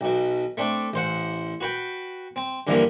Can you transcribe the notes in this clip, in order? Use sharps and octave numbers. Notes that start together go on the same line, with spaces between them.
B1 B2
A3 C4 D4
A1 C5 F#5
F#4 B4 G5
C4
G2 D3 E3 F3 A#3